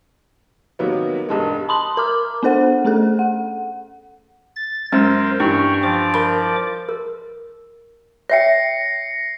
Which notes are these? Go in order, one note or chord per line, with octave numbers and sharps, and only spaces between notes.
C3 D#3 F#3 G3 A#3 B3
E1 G2 G#3
A5 B5 C6 D#6 F#7
A#4 A#5 D6 F6
B3 D4 A4 C5 F#5
A3 C#4 G#4 A4
F#5
A6
F#2 G#3 A#4 C5
G2 E3 G5 C#6
F3 D5 D6
A#4 B5
A#4
C#5 E5 G5 A#6 C7 C#7